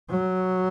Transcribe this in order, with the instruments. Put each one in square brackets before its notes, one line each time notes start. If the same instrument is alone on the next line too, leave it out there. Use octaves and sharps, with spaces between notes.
[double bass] F#3